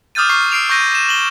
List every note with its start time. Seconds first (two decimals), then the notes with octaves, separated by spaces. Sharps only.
0.15 D6 D#6 F6 G6 A6 D#7
0.29 C#6 C7
0.51 E6 C7 D7 F7
0.69 C#6 G6 A#6 D#7
0.92 D#7 E7
1.09 F#7 G7